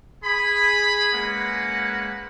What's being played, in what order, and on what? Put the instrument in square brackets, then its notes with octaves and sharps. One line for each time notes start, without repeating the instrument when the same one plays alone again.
[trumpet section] G#4 B5
G#3 A#3 C#4 B4 F#5